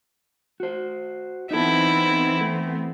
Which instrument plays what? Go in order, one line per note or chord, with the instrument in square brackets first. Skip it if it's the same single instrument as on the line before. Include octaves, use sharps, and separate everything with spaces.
[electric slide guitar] F#4 C5
[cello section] E3 B3 C4 [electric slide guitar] D#4 A4 [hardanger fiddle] E4
[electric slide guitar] A3